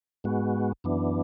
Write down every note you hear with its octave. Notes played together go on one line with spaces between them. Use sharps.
G#2 G#3 B3 F#4
F#2 E3 B3 D4